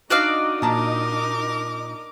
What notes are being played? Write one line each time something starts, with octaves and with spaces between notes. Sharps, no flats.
D4 D#4 F#4 D5 D#5 F5
A#2 A#4 A5 A#5 D6